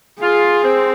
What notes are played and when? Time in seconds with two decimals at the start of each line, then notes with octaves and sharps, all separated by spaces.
0.21 F4 G#4
0.63 C4